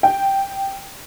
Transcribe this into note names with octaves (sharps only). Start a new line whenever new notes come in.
G5